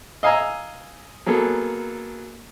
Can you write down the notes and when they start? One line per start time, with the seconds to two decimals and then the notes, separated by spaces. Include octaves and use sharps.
0.23 D#5 F5 G#5 A#5 E6
1.26 F#3 A#3 B3 G#4 A4